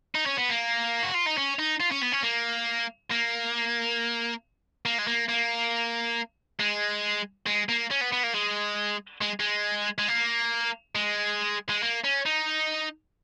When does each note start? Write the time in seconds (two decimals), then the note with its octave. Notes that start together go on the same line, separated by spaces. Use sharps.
0.15 D#4
0.26 C#4
0.38 B3
0.50 A#3
1.03 F#4
1.14 F4
1.26 D#4
1.37 C#4
1.59 D#4
1.80 F4
1.92 C#4
2.03 B3
2.13 C#4
2.24 A#3
3.11 A#3
4.86 A#3
4.99 G#3
5.08 A#3
5.29 A#3
6.60 G#3
7.47 G#3
7.69 A#3
7.91 C#4
8.01 B3
8.13 B3
8.23 A#3
8.34 G#3
9.21 G#3
9.40 G#3
9.98 G#3
10.08 A#3
10.95 G#3
11.69 G#3
11.83 A#3
12.04 C#4
12.26 D#4